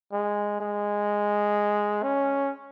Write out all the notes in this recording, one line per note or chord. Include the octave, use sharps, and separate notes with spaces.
G#3
G#3
C#4